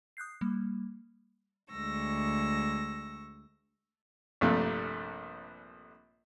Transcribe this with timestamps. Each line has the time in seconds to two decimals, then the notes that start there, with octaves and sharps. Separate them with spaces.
0.17 D#6 F#6 G6 C7
0.41 G3 A#3
1.71 D2 G#3 C#6 E6 A#6
4.41 A#1 G2 C3 A3 A#3